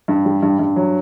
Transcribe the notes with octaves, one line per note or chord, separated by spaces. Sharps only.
G2
G3
G2
G2
F#3